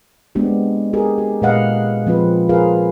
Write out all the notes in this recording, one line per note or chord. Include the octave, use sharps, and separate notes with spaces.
G#3 B3 C4 D4 G4
G4 G#4 A#4
G4
A#2 G#3 B4 D#5 F5 F#5
F3 C4 F4 B4
F4 G#4 A#4 B4 F5